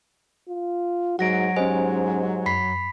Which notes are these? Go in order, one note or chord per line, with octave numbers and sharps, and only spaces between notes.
F4
G#2 F#3 F#4 F#5 A#6 D7
G#2 C#4 G4 C5 D#5 G#5
F#2 B5 B6 C7